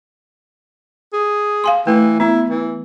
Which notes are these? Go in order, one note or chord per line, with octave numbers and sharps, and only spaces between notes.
G#4
F5 G#5 C6
E3 A3
B3 E4
E3